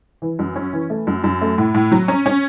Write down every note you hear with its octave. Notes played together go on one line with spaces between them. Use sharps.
E3
F#2
C#4
E3
A3
F#2
F#2
A3
A2
A2
F#3
C#4
C#4